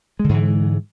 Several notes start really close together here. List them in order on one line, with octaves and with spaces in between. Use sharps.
G#3 D3 G#2 E3